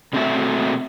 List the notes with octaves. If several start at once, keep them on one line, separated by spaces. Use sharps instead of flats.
B2 A3 C4 D4 F#4 E5